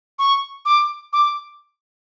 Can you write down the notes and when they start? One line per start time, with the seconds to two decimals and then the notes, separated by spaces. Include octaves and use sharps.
0.19 C#6
0.65 D6
1.13 D6